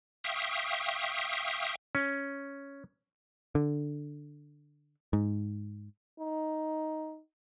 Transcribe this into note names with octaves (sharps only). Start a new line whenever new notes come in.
E5 F5 G5 C#6 D#6
C#4
D3
G#2
D#4